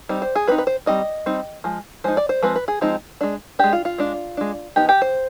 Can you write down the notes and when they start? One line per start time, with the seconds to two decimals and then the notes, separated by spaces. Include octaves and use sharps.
0.09 G3 C4 D#4
0.22 C5
0.35 G#4
0.48 G3 C4 D#4 B4
0.58 B4
0.67 C5
0.86 G3 C4 D#4 D#5
1.26 G3 C4 D#4
1.64 F3 G#3
2.04 F3 G#3 D#4 C5
2.17 D5
2.29 C5
2.43 F3 G#3 C4 B4
2.56 B4
2.68 G#4
2.81 F3 G#3 C4 D#4
3.21 G#3 D4
3.59 G#3 D4 G4
3.73 F4
3.85 F4
3.98 G#3 D4
4.37 G#3 D4
4.76 F3 B3 D#4 G4
4.89 G4
5.02 C5